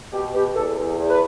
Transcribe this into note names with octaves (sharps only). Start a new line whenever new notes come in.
B2 G4
B2 G4
E2 A4
E2
E2
B4